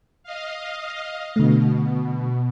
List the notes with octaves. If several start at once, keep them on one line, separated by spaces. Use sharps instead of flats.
D#5 F5
B2 D3 A3